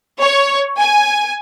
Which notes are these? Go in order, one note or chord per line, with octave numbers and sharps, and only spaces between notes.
C#5
G#5